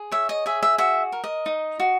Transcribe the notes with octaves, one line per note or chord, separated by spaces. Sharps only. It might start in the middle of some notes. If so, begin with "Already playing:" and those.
Already playing: G#4
C#5 E5
D#5
G#4 E5
E5
F#4 E5
A#4
D#5
D#4
F#4